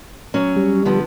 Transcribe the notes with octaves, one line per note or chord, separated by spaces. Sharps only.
F#3 C#4
G3
D3 F3 B3